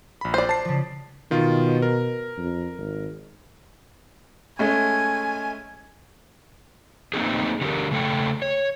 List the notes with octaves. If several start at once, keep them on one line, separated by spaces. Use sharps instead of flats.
A#1 B5
C5 D5
A5 C7
C#3 F3
B2 D#3 F4
A#4
F2
G#1
G#3 A3 C#4 G#5
A3 A#3 C4 D#4 G4 G#4
D3 G4 G#4 A#4
C#3 A3 A4 G5
C#5